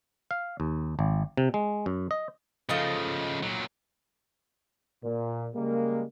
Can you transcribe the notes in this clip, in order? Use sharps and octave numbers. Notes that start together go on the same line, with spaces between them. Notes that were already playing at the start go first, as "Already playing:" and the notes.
F5
D#2
G#1
C3
G#3
F#2
D#5
C#3 F3 A3 F4 D#5
A#2 F#3
A#2
C#3 G3 G#3 A#3